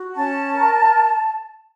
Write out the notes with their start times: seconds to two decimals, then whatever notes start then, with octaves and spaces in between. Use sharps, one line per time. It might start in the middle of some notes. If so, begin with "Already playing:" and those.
Already playing: F#4
0.15 C#4 A5
0.53 A#4